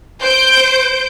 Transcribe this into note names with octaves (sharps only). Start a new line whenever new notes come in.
C5 G6 D7